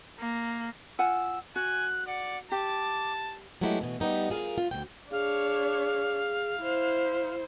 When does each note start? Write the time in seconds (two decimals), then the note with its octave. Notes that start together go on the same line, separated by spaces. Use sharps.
0.19 A#3
0.99 F4 F#5 G#5 E6
1.56 F#4 G#5 F#6
2.07 D5 F#5
2.52 G4 A5 D6
3.61 F#3 G#3 A3 B3 E4 G4
3.81 B2 E3
4.00 G3 B3 D#4 G4
4.30 F4 G#4 A#4 F5
4.58 F4
4.71 D2 D#3 G5
5.11 D4 G#4 C#5 F5
6.58 E4 C5